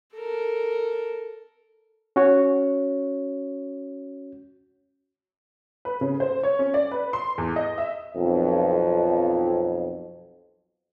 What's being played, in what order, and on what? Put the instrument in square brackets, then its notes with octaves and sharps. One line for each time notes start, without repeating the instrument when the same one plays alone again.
[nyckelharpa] A4 A#4
[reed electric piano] C#4 F#4 C#5
[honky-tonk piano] B4
C#3
C5
C#5
C#4
D5
B4
C6
E2
D#5
E5
[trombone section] B1 F2